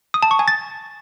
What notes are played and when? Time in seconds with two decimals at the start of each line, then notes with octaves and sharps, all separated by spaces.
0.14 D#6
0.23 A5
0.31 C#6
0.39 G#5
0.48 A6